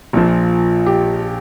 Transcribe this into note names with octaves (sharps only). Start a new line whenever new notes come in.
A#1 A#2 F3
G4